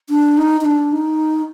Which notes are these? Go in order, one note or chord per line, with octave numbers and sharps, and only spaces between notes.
D4
D#4
D#4
D4
D#4